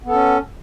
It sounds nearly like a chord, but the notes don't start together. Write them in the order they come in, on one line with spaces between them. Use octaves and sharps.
B3 A4 C#4